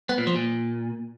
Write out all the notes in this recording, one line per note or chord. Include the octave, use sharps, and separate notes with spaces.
B3
A#2
F3
A#2